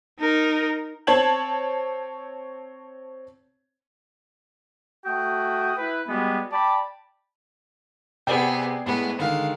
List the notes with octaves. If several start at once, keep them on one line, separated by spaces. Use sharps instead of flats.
D#4 A#4
C4 C#5 A5 G#6 F#7
A3 F#4 G5 D#6
E4 B4
G3 G#3 B3 F#4
D5 G5 A5 B5
C3 B3 G#4 D5 G5
A2 G#3 B3
D3 D#3 G#3 F5